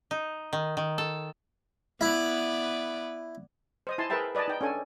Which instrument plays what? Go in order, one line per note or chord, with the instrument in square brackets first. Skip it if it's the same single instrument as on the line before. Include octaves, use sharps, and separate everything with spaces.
[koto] D#4
D#3
D#3
A4
[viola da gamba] B3 B4 D5 [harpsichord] E4
[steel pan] C5 D#5 D#6
E4 G#5 A5 C6
G#4 A#4 B4 E5 G5 A5
B4 D5 D#5 G#5 A5
D#4 G5
C#4 D4 A4 G#5